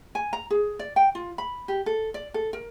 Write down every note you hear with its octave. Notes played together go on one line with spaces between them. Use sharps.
G#5
A#5
G#4
D5
G5
F4
B5
G4
A4
D5
A4
A#4